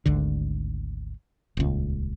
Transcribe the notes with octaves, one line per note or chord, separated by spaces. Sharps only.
G#1 D2 D3
D#1 C#2